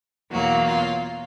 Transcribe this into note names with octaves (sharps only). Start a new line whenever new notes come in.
E2 B2 F#3 A#3 F#4
F4